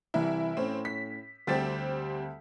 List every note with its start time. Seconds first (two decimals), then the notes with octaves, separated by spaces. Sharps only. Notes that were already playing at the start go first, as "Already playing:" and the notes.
0.14 C2 E3 E4
0.57 A2 C4 C#4
0.85 B6
1.47 D2 G3 C4 G4 A6 B6